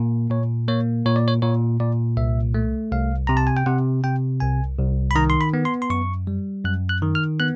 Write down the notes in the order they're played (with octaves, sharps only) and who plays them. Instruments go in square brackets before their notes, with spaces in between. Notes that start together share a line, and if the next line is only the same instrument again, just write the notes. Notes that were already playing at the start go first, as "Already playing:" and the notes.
Already playing: [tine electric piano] A#2 A#3
A#2 C#5
A#3 C#5
A#2 C#5
D5
C#5
A#2 C#5
A#2 D5
C2 E5
A3
C2 F5
C3 A#5
A5
G#5
G5
C3 F#5
C3 G5
C2 G#5
C2
B5
D#3 A#5
C6
B5
B3
C6
C6
F#2 C#6
G3
F#2 F#6
F#6
D#3
F6
B3 F#6